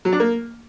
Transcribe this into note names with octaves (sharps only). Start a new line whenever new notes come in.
F#3
D4
A#3